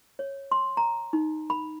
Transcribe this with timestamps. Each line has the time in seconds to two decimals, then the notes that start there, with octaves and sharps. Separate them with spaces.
0.19 C#5
0.52 C6
0.77 A#5
1.13 D#4
1.50 B5